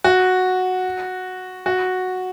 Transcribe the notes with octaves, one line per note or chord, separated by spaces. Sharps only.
F#4
F#4